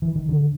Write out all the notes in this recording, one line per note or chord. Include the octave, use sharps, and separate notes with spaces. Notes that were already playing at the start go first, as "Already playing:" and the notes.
E3
D#3
D3